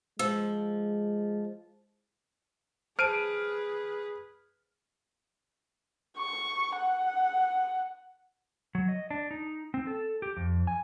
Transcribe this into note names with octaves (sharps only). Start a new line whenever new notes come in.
F3 G#3 E6
G#4 B4 C5 A5 F6 D7 D#7
C#6
F#5
F#3
D#5
D4
D#4
C4
A4
G4
F2
G#5